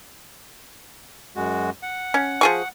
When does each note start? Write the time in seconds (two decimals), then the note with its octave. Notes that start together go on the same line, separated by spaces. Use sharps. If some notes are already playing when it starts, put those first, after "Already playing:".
1.36 F#2 G#3 F#4
1.83 F#5
2.14 C#4
2.41 F3 G#4 C#6